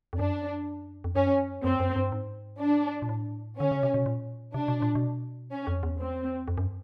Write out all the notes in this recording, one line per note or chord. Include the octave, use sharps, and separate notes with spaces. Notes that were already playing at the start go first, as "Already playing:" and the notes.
F2
F#2 D4
F2
F#2 C#4
F#2 C4
F#2
G2
G#2
D4
A#2
A2
D3 C#4
C#3
C3
B2
A#2
C3 D4
B2
A#2
B2
C#4
F2
E2
C4
F2
F#2